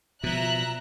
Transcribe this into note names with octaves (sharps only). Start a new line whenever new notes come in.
B2 F3 E5 A#5 F#6